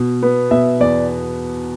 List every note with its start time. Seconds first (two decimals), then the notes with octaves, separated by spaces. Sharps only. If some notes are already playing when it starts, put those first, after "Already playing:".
Already playing: B2
0.23 B3
0.51 B2 E5
0.80 E2 D5